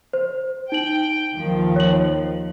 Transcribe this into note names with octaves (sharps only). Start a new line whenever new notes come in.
C5
D#4 G5 F#7
D#2 D#3 F3
C#5 F#7